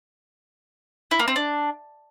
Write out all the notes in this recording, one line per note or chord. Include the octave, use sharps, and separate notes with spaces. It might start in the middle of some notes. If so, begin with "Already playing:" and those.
E4
A#3
C4
D4